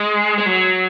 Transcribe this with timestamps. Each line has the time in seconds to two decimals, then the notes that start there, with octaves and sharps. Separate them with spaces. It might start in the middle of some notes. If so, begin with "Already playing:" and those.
Already playing: G#3
0.38 G#3
0.46 F#3